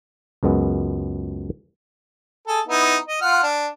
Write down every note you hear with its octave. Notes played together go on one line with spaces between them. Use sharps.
C#2 F#2 G#3 B3
G#4 A4
B3 D#4 E4
D#5
F4 F#5 F6
D4